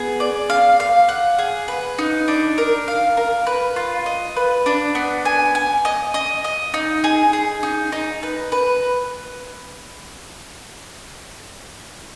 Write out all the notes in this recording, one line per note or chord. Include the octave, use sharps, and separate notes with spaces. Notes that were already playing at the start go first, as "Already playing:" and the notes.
Already playing: B3 G#4
D5
F5
F5
F#5
G#4
B4
D#4
D4
A#4
F5
A#4
B4
F4
D#5
B4
D4
B3
G#5
G#5
D#5
D#5
D#5
D#4
G#4
G#4
D#4
D#4
B4
B4